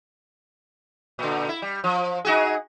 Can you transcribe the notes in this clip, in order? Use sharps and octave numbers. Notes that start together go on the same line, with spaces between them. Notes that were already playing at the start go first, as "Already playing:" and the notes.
A#2 D3
E4
G3
F3
D#4 F#4 G#4